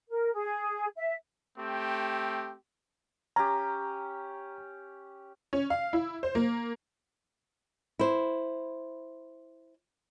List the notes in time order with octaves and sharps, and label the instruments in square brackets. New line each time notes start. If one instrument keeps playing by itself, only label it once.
[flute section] A#4
G#4
E5
[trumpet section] A3 C4 G4
[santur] C#4 G4 [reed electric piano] A#5
[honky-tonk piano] C#4
F5
E4
C5
A#3
[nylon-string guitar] E4 C5